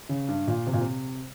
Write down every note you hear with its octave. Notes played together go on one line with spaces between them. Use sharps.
C#3
G2
A#2
C3
A#2
C3